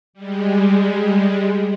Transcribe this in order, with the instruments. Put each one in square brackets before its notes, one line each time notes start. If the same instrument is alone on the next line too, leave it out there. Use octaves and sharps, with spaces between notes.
[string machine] G3 G#3